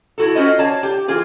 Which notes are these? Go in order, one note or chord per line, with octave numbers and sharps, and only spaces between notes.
E4 F#4 A4
C#4 F4 F#4 C5 D#5
C#5 D5 F5 G#5 A5
G4
E3 F4 G#4 C5